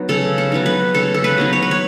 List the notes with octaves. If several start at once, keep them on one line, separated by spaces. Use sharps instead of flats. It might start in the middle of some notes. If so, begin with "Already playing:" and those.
Already playing: F#3 B3 D#4
C#3 A4
A4
F#3 B3 D#4
B4
C#3 A4
A4
B4
F#3 B3 D#4
C#5
B4
C#5